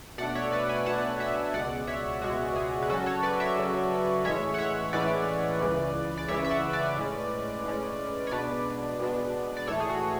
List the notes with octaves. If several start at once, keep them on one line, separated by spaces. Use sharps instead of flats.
B2 A3 D4 D5 F#5
C#5 E5
B4 D5
G#5 B5
B2 A3 D4 F#5 A5
C#5 E5
C#2 B2 G#3 D5 F#5
C#5 E5
C#2 B2 G#3 F#4
G#4
B4
C#3 F#3 C#4 F#4 A4
A4 C#5
B4 D5
C#5 E5
C#3 F#3 C#4
A2 E3 G#3 C#4 C#5 E5
F#5
C#5 E5
A2 E3 G#3 C#4 B4 D5
C#2 C#3 E3
D5
C#2 C#3 E3 C#5 E5
E5
D5 F#5
B4 D5
A2 G#3 C#4
A2 G#3 C#4
C#5
B2 G#3 B3 D4 B4 D5
B2 G#3 B3 D4
D5
A2 E3 A3 A4 C#5
G#4
F#4